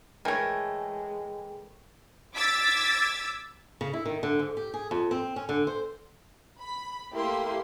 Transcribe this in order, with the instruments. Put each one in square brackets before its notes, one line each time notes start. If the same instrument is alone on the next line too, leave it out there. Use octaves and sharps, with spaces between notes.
[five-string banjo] E3 A3 [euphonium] G#3 [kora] A#4 C#5 [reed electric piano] G5 G#5
[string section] D6 E6 G#6 A6 B6
[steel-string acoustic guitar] C#3
E4
D#3
D3
G#2
G4
G#4
F2
C4
C#4
D3
C5
[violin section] B5
A3 A#3 E4 G4 C6